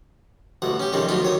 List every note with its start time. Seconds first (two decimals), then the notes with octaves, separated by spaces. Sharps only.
0.62 A1 D2 B2 F#5
0.80 C#4 G4
0.93 F2 C3 D#3 G3 G#3 C#4
1.08 A1 D2 F#3 D#4 F4 B5
1.22 D2 D#3 C#5 D#6